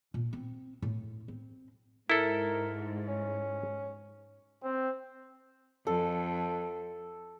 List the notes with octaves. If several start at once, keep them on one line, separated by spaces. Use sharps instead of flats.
A#2
C4
A2
C4
G#2 E4 A4 A#4
C#4
C4
F2 A4